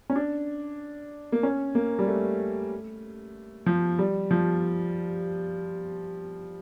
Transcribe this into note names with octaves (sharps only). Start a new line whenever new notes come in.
C#4
D4
A#3
C#4
A#3
G3
A3
F3
G3
F3